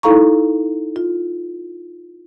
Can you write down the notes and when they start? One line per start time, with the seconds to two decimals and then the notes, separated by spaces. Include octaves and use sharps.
0.03 D#4 E4 A4 F5 A#5 C#6
0.96 F4